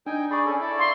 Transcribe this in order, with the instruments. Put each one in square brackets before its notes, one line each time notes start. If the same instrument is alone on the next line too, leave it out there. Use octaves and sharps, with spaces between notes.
[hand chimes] D4 [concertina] D#4 G5 G#5
[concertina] G#4 D5 [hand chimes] B5 C#6
[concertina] C#4 A4
E4 A4 D5
[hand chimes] F5 B5 [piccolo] C6